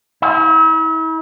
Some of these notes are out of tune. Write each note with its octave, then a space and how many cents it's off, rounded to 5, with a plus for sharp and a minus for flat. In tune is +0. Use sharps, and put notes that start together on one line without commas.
E4 -40